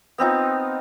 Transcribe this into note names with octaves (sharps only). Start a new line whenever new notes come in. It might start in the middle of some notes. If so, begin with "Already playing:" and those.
B3 C4 D#4 F4